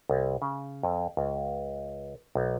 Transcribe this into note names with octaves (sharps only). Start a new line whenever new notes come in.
C2
C#3
F2
C#2
B1